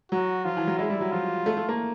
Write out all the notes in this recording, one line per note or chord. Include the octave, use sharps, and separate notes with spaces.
F#3 F#4
F3 F4
E3
F#3
G#3 E4
G3
F#3
F3 F4
A3
A3
A#3